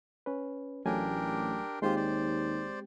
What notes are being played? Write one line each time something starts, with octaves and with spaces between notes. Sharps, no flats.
C#4 B4
A1 F#3 A3 D4 G4 A#4 G#5
D#2 G#3 C4 F4 G4 C5 C6
C5 D5